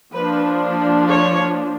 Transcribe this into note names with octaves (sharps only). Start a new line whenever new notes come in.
F3 A#3 D4 B4
C#5